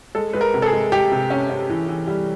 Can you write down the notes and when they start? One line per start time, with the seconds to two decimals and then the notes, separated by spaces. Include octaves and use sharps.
0.15 G#3 A4
0.33 G#3 B4
0.41 A#4
0.54 C3
0.62 A4
0.66 G#4
0.72 G#3
0.92 G#3 G4
1.12 C3
1.30 C#4
1.50 C#4
1.69 E3
1.88 E3
2.07 G3